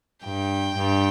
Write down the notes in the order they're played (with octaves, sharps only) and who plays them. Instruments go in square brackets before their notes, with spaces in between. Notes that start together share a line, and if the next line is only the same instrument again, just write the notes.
[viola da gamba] G2 [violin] G5
[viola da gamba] G2